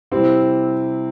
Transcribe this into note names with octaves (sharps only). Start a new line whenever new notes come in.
C3 G3 C4 E4